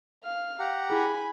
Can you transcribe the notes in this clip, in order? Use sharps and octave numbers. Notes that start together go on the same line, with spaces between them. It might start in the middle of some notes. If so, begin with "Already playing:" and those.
F5 F6
G4 F5 F#5 A#5
E4 G#4 G#5 B5